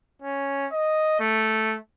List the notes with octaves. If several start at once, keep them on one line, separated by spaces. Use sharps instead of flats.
C#4
D#5
A3